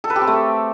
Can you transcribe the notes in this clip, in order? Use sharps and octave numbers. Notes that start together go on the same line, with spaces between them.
A4
B4
G4
C4
A3